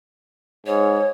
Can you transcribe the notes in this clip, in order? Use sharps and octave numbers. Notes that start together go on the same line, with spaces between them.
G#2 C#5